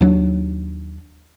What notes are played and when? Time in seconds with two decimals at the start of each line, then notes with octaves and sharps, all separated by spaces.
0.01 D#2 F#3 D4